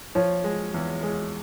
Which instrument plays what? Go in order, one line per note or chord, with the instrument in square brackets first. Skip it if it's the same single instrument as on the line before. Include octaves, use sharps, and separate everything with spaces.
[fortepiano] F3 [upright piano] C#5
[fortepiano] G#3
E2
G#3